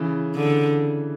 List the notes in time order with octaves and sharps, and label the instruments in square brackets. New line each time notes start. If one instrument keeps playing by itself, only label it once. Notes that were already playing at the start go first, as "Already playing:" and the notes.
Already playing: [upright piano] C#3 E3
[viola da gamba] D3